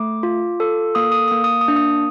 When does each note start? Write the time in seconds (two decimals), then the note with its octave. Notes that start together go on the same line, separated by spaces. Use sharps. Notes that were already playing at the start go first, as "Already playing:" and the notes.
Already playing: A3 D6
0.23 F4
0.60 A4
0.95 A#3 D#6
1.12 D#6
1.28 D#6
1.32 A#3
1.44 D#6
1.61 D#6
1.68 D4
1.76 D#6